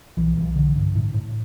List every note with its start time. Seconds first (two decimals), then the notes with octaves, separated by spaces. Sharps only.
0.17 B1 E3
0.37 B1
0.56 D3
0.75 G2
0.95 A2
1.14 A2